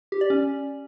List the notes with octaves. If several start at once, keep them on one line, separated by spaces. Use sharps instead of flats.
G4
D5
C#4